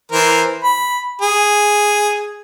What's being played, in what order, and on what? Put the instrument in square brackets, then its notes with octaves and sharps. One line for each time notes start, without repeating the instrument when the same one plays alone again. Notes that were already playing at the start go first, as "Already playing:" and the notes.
[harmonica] E3 A#4 C5
B5
G#4